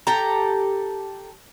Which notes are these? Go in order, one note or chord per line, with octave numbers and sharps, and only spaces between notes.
G4 A4 A#5